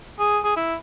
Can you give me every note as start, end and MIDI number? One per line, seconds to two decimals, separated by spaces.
0.19 0.39 68
0.44 0.55 68
0.56 0.75 64